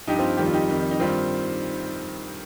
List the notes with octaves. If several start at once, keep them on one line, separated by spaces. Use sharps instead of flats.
G2 F3 D#4 G4
C4 F4
F2 D#3 G3 G4
F4
D#4 G4
F2 D#3 G3
D#4
G2 D#3 G3 C4 F4